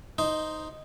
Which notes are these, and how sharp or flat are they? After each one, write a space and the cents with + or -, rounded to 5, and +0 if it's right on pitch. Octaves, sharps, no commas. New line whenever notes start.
D#4 +0 C5 +0 D#5 +0